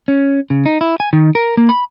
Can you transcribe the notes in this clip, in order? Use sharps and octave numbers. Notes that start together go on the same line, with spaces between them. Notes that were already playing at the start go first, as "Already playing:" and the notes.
C#4
C#3
D#4
E4
G#5
D#3
A#4
A#3
B5